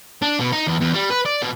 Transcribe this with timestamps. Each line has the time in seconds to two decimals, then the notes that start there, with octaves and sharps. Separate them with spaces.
0.22 D4
0.40 B2
0.53 D#4
0.67 E2
0.81 E2
0.94 G3
1.10 B4
1.25 D5
1.42 B2